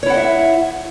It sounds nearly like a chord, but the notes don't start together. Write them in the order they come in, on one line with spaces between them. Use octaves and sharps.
C#5 E4 F#5 D#5 E5